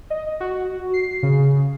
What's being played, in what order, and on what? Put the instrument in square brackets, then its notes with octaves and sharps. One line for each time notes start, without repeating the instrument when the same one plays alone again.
[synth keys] D#5
F#4
C7
C#3